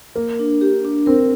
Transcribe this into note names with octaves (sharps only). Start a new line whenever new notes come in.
A#3 A#4
D4
G4
D4
C4 A#4